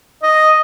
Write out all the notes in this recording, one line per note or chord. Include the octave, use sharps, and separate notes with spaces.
D#5